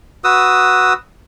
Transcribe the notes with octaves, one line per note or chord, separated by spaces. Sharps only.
F#4 B4 D#6 E6